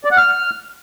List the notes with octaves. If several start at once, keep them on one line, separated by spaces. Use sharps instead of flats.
D5
F#5
F6